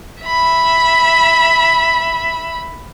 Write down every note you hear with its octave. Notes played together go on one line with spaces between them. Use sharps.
E5 B5